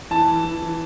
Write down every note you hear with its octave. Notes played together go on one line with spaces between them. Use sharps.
E3 A5
E3
E3
E3